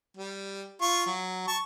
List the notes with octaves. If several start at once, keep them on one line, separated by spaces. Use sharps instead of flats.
G3
F4 C#6
F#3
A5 C#6